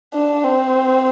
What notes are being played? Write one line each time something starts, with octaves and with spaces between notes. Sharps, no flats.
D4
C4